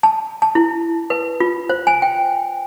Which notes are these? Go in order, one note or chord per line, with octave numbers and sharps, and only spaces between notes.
A5
A5
E4
B4
F4
C5
G#5
G5